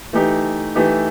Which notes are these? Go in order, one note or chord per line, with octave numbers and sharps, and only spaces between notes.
E3 A3 D#4 G4
E3 A3 D#4 G4